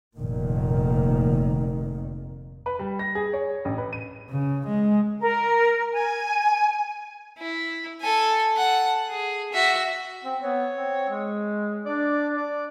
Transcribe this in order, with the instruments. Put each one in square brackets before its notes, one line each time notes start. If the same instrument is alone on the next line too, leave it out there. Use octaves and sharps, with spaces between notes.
[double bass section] F1 A#2 D#3
[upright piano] B4
G3
A#6
G#4
C#5
A1
B4
D#7
[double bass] C#3
G#3
[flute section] A#4
G#5
[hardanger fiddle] E4
A4 G#5
F#5 A5
G#4
F#4 E5
[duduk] C4
[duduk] B3 [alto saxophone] C#5
[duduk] C4
G#3
[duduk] D4 [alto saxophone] D5
[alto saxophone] D5